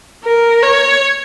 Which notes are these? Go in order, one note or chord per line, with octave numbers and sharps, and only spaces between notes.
A#4
C#5